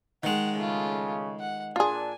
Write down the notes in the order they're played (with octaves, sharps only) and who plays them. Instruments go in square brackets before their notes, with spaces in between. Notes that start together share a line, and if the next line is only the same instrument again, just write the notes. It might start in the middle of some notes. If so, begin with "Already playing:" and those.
[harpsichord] D#3 G#3 [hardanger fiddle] F#5
[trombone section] C#3 [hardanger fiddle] A3 F4
[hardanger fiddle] F#5
[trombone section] A#2 D4 [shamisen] F4 G#4 [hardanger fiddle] G#5